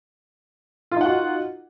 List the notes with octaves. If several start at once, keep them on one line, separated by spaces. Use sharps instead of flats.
D#4 F4 F#4 F#5